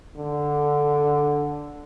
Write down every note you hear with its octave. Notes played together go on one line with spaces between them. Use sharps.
D3